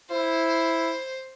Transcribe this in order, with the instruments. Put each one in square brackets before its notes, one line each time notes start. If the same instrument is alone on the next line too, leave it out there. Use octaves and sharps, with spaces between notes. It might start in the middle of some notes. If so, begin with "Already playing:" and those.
[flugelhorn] E4 [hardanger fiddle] C5